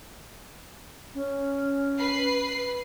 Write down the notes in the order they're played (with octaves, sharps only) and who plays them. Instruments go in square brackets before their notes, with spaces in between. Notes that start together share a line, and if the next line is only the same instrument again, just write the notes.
[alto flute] C#4
[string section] B4 B5 C7